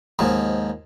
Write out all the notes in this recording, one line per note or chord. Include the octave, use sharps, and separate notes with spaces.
D#2 G#2 F3